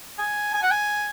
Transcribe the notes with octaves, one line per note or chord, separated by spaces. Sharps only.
G#5
G#5
F#5
G#5